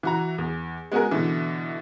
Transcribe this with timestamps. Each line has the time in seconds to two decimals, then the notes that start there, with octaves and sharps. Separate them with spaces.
0.03 E3 F#4 A#5
0.38 E2
0.92 G#3 B3 F#4 G#4 A#4
1.11 B2 D3 E3